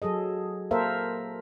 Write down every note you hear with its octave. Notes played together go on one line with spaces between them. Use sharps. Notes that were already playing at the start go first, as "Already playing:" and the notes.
F#3 G#4 A4 D#5
A#3 A4 A#4 C5 E5 F5